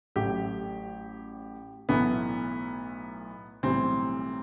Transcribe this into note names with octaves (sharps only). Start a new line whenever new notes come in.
A1 A2 F#3 A3 G4
B1 A2 E3 A3 B3
B1 A2 E3 G3 C4